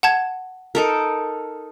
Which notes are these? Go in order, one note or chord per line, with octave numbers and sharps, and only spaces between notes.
F#5 A5 G#6
D#4 A4 A#4